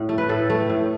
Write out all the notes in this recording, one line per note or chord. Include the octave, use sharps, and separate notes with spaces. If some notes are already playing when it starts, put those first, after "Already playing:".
Already playing: A2
A3
B4
A2 A4
A3
A2